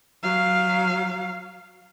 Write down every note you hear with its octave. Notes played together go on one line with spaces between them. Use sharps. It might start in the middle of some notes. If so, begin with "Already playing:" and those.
F#3 F5